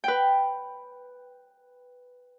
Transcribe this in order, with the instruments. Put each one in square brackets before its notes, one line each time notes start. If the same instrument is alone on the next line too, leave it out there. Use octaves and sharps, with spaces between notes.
[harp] B4 G5